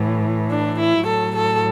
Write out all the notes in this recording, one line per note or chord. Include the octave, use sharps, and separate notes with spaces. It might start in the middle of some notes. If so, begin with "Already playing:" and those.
Already playing: A2 E3
D4
E4
A2 F#3 A4
A4